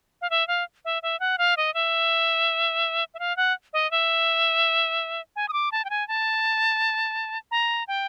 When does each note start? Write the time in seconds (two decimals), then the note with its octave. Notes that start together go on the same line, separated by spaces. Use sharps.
0.21 F5
0.30 E5
0.48 F5
0.85 E5
1.03 E5
1.20 F#5
1.38 F5
1.57 D#5
1.74 E5
3.14 E5
3.19 F5
3.37 F#5
3.73 D#5
3.91 E5
5.36 G#5
5.49 D#6
5.53 D6
5.72 A5
5.85 G5
5.90 G#5
6.08 A5
7.51 A#5
7.88 G5